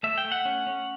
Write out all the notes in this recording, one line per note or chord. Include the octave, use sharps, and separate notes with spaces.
A3 E5
G5
A3
F#5
C#4
C#4